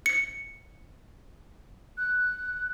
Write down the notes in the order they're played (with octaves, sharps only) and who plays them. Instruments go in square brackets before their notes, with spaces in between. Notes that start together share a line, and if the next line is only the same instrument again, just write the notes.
[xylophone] C#7
[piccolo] F#6